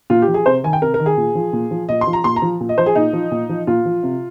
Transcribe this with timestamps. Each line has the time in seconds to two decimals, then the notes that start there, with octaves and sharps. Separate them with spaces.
0.10 A#2 F4
0.22 G4
0.28 F3
0.34 G#4
0.46 C3 C5
0.64 D#3 G#5
0.73 G5
0.82 C3 A#4
0.94 A#4
1.00 D#3
1.06 G#4
1.17 A#2
1.35 F3
1.53 A#2
1.71 F3
1.89 A#2 D#5
2.01 C6
2.07 F3
2.13 A#5
2.24 A#2 C6
2.36 A#5
2.42 F3
2.60 A#2
2.69 D#5
2.78 F3 C5
2.86 G#4
2.95 A#2 D#4
3.13 F3
3.31 A#2
3.49 F3
3.67 A#2 F4
3.85 F3
4.03 C3